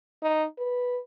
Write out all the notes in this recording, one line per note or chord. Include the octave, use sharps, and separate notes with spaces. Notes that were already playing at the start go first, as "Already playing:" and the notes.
D#4
B4